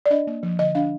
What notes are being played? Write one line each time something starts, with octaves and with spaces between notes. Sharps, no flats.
D5
D4 D#5
A#3
F3
D3 D#5
D4 F5